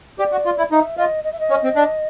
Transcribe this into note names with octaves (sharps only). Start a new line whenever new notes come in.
G4 D5
F#4
F4
E4
D#4 E5
F4 D#5
D#5
E5
D#5
C#4
C4
D4